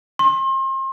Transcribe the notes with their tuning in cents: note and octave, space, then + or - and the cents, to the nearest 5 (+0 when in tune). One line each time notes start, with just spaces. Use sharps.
C6 +35